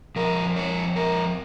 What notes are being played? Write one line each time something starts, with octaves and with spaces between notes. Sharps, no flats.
F2 F3 A#4
C#5
A#4